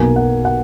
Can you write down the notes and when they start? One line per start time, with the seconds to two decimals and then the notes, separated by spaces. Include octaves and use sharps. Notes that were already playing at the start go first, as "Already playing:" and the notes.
Already playing: B1 B2 A#3 G#5
0.16 F#5
0.45 F#5